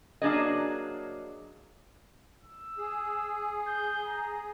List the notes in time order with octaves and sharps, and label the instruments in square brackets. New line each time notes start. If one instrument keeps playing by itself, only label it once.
[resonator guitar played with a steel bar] F#3 A#3 D4 G#4 D#5
[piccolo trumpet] E6
[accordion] G#4
[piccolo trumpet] G6
A#5